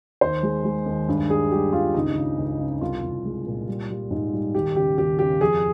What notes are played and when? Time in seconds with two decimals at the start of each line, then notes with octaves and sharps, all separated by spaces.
0.21 D#2 C5
0.43 G#3
0.64 G#3
0.86 D#2
1.08 G2
1.29 G3 G#4
1.51 G3 G4
1.73 G2 F4
1.94 C#2 D#4
2.16 C#3
2.38 C#2
2.59 C#3
2.81 C2 F4
3.03 C2
3.25 G#3
3.46 A#2
3.68 G3
3.90 G3
4.10 G#2
4.33 G3
4.55 D#2 G4
4.76 C#3 G4
4.97 D#2 G4
5.19 C#3 G4
5.41 F2 G#4